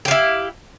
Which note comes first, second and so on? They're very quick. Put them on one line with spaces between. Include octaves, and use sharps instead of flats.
G4 F5 E4